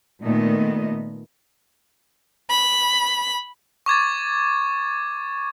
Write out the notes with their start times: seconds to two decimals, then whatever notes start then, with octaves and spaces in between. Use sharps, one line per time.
0.22 A#2 D#3 A3 B3 D#5
2.49 B5
3.86 C#6 D6 G#6 A6